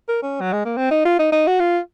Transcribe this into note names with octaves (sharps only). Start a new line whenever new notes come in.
A#4
C#4
F#3
G#3
A#3
C4
D#4
F4
D#4
D#4
F#4
F4